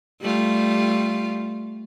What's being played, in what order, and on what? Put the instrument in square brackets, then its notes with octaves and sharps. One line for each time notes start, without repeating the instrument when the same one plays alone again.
[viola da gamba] G3 A3 F4